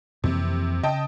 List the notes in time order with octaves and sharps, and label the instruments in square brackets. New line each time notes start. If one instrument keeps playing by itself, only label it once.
[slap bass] F2 E3 A#3 [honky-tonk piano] C3
[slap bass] C#3 [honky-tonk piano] D#5 G5 A5